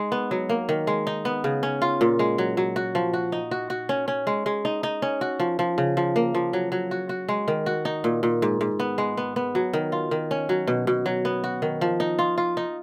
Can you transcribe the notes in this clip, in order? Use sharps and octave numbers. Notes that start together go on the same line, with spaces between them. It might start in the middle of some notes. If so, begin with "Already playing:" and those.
Already playing: G#3 D#4
B3
F#3
A#3
D#3
G#3
D#4
B3
C#3
C#4
F4
A#2
G#3
F#3
F#3
F#4
F3
F#4
D#4
F#4
F#4
C#4
C#4
G#3
G#3
D#4
D#4
C#4
F#4
F3
F3
C#3
F3
A#3
F3
F#3
F#3
F#4
F#4
G#3
D#3
F#4
D#4
A#2
A#2
G#2
G#2
B3
G#3
B3
B3
F#3
D#3
F4
D#3
C#4
F#3
B2
B2
F#3
B3
F#4
D#3
F3
D#4
F4
F4
D#4